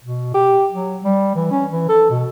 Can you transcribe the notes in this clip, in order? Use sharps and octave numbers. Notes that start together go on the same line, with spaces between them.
B2
G4
F#3
G3
E3
C#4
E3
A4
B2